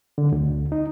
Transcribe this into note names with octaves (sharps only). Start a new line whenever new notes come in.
D3
D2
D#4